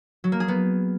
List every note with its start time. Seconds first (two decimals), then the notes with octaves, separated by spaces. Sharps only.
0.24 F#3
0.32 A#3
0.40 G#4
0.48 B3